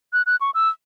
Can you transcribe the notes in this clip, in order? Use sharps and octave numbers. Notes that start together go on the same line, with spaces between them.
F#6
F#6
C#6
E6